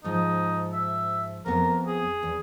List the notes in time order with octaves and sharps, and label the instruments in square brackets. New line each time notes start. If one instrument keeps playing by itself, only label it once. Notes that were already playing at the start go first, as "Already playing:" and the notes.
[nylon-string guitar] G#2 F3 [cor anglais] D#4
[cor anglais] E5
[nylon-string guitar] F2 B3 [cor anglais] A#4
[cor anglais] G#4
[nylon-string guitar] E2